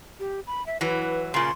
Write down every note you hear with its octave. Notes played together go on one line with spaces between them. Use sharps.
G4
B5
E5
E3 F#3 B4
A#2 C#3 C6